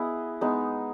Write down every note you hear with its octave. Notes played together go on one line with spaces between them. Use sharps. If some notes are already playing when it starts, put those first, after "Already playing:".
Already playing: B3 E4 G#4 D#5
G#3 B3 D#4